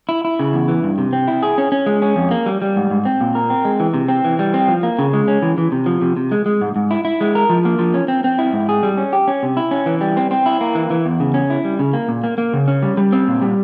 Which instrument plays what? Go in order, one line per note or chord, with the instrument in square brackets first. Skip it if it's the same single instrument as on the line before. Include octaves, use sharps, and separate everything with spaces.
[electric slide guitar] E4
E4
C#3
E2
E3
G2
C3
C4
E4
G#4
C#4
C#4
G#3
C#4
F2
A#3
G3
G3
G#2
G#2
C4
A#2
A#4
C4
G#3
E3
C3
C4
E3
G3
C4
F3
A#3
C#3
G#3
C#4
E3
E3
C3
F3
C3
C3
G#3
G#3
G#2
G#2
E4
E4
G#3
A#4
F3
A#3
F3
C#4
C4
C4
E4
G#2
G#4
G3
C#4
G4
C#4
C3
E4
C#4
E3
G3
C4
C4
E4
A#3
E3
E3
E2
C#3
C#4
E4
G3
C#3
A#3
A#2
A#3
A#3
C#3
C#4
G3
G3
C4
A#2
G3